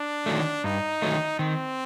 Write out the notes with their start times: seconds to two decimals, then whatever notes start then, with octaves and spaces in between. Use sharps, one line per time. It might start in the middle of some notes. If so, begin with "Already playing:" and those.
Already playing: D4
0.26 D#3 F#3 A3
0.64 G2 D#4
1.02 D#3 F#3 A3
1.39 D#3 C4